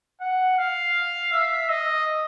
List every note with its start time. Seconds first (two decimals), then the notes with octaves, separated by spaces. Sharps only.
0.21 F#5
0.58 F5
1.32 E5
1.69 D#5